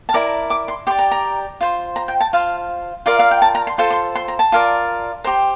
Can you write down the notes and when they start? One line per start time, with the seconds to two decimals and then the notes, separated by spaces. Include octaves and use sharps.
0.09 A5
0.14 E4 A#4 D5 A#5
0.50 D6
0.68 C6
0.87 G4 C6
0.91 D5
0.99 A#5
1.11 A#5
1.61 F4 C5
1.96 A#5
2.08 G5
2.21 A5
2.33 F4 C5 F5
3.06 F4 A#4 D5 F5
3.19 F5
3.31 G5
3.42 A5
3.55 A#5
3.67 C6
3.78 F4 A4 C5 C6
3.90 C6
4.15 C6
4.28 A#5
4.39 A5
4.52 F4 A#4 D5
5.24 G4 C5 A#5